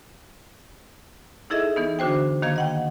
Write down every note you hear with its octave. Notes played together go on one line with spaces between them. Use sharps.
D#4 E4 G#4 A4 D#5 E5
E3 B3 D#4
D3 D4 F#4 C5 G5
D#3 A#3 D#5 F5 G#6
D#5 F#5 G5